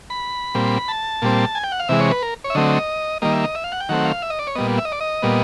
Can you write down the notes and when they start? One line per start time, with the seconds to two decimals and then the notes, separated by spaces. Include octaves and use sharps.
0.10 B5
0.54 A#2 G3 C4
0.88 A5
1.22 A#2 G3 C4
1.55 G#5
1.64 G5
1.72 F#5
1.80 F5
1.89 C3 E3 G#3 E5
2.00 C#5
2.11 B4
2.22 A#4
2.44 C#5
2.50 E5
2.55 D3 F#3 A3 C4 D#5
3.22 D#3 G3 A#3 D#5
3.33 E5
3.44 D#5
3.55 E5
3.64 F5
3.72 F#5
3.80 G5
3.89 D#3 F#3 A3 C4 F#5
4.05 F5
4.22 E5
4.30 D#5
4.39 D5
4.47 C#5
4.55 A#2 G3 B3 D#5
4.78 E5
4.85 D#5
4.92 D5
5.00 D#5
5.22 A#2 G3 B3